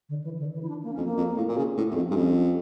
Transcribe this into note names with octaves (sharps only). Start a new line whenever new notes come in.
D3
E3
D3
E3
E4
D4
A#3
F2 C#4
A#3
F2
A2
A#2
C#3
A2
E2
F2
G2
F2 C#4
C#4